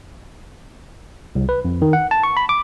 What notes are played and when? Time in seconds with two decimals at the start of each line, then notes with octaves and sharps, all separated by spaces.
1.35 C2
1.49 B4
1.65 F2
1.82 D#3
1.93 F#5
2.11 A5
2.23 C#6
2.37 B5
2.49 D6